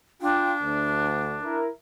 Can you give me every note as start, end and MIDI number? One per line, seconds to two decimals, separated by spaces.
0.22 1.57 62
0.22 0.52 65
0.22 0.52 79
0.62 1.36 38
1.43 1.68 64
1.43 1.68 70